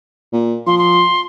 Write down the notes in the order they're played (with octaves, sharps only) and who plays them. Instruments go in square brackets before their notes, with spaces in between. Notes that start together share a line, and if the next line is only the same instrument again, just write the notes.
[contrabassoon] A#2
[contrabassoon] F3 [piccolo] C6
[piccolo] C6